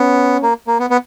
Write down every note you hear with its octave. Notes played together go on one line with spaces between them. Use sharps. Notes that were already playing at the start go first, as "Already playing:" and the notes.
Already playing: B3 C#4
A#3
A#3
B3
B3